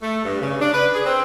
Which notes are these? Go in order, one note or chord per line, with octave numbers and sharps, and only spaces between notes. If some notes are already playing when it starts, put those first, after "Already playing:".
A3
G2
C#3
D4
B4
G#4
C4